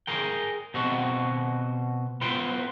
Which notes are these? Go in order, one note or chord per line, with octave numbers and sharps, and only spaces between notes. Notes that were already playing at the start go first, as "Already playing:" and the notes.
G#4 A#4 G5
B2 C4 F#4
B3 F4 B4 C5 G5